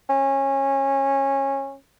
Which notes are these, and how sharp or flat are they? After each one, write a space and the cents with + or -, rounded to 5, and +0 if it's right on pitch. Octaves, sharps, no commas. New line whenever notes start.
C#4 -20